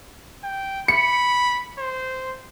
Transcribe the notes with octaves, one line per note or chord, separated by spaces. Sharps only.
G5
B5 C#7
C5